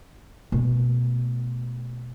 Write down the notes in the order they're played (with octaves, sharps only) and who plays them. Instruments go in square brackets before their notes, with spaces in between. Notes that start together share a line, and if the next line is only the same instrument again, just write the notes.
[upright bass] B2 A3